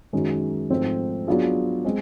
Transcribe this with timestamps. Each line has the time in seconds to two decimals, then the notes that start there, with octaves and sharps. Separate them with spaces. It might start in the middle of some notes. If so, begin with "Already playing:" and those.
0.13 F#2 D#3 G#3 C#4
0.70 G#2 F3 A3 C4
1.27 F#3 B3 D4 F4 G#4
1.85 G#3 C4